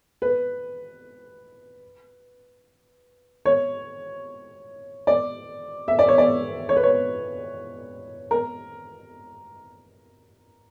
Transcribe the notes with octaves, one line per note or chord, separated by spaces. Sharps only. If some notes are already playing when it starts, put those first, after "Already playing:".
B4
C#5
D5
E5
D5
C#5
D5
C#5
B4
C#5
A#4